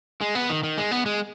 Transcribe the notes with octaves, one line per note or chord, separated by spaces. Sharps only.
G#3
B3
D#3
D#3
G#3
B3
G#3